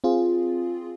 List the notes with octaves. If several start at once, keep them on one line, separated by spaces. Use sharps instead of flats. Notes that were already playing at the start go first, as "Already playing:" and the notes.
C4 F4 G#4